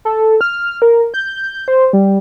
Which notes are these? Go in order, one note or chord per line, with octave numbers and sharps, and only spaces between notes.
A4
F6
A#4
G6
C5
G3